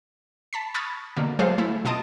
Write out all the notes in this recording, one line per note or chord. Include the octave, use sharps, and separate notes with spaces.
A5 B5 B6
B5 C#6 D#6 F6 G#6 A6
B2 D3 A#3
F#3 G#3 G#4 A4 C5 F5
A3 E4
B2 F4 D#5 A5 D#6 D7